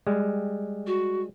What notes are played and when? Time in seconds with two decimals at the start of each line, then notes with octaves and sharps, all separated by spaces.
0.07 G3 G#3
0.87 F#4